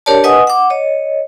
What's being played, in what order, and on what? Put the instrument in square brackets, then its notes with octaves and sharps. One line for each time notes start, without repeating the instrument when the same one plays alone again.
[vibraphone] D4 G4 A#4 C#5 D5 A5
B4 D#5 F#5 G#5 D#6
F#5 D6
C#5 D#5